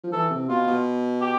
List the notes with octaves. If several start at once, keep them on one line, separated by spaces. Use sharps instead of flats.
F3
E3 A4
C3
B2 F4
B2
G4